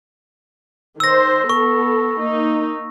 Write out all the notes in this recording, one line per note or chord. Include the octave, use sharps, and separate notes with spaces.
D#3 C5 E6 A#6
B3 A4 C#6
A#3 D#4